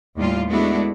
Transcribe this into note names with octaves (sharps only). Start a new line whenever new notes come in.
D#2 A2 G3 F4
G#3 A3 B3 D4 E4 F#4